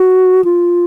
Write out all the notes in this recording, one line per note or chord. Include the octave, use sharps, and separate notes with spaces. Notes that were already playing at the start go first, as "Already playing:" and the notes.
Already playing: F#4
F4